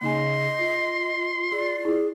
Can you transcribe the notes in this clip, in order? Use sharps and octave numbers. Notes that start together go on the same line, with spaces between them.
C#3 A#3 D#4 D#5 G#5 C6
F4
G#4 D5
E4 F4 G#4